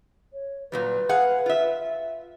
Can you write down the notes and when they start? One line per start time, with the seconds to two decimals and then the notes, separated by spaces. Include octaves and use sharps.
0.33 C#5
0.72 A#2 F#3 G3 B4
1.09 G#4 F5 F#5
1.46 F4 E5